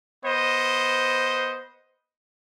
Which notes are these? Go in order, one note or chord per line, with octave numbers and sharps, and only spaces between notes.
B3 C5 D#5